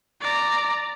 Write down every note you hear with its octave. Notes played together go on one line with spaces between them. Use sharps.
D5 A#5